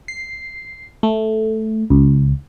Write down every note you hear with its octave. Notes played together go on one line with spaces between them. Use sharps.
C7
A3
C#2